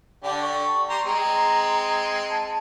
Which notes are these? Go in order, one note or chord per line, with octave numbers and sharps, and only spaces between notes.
D3 G4 D5
C#6
G3 A#5 C6
G#3 C4 A#5
A5